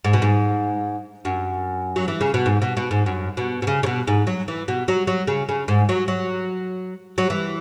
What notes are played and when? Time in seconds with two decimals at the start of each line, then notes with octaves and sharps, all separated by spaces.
0.04 G#2
0.13 B2
0.22 G#2
1.25 F#2
1.96 F#3
2.08 E3
2.21 C#3
2.34 B2
2.46 G#2
2.62 B2
2.77 B2
2.91 G#2
3.06 F#2
3.37 B2
3.62 B2
3.67 C#3
3.83 C#3
3.86 B2
4.07 G#2
4.27 F#3
4.48 E3
4.68 B2
4.88 F#3
5.07 F#3
5.27 C#3
5.49 C#3
5.68 G#2
5.89 F#3
6.08 F#3
7.18 F#3
7.30 E3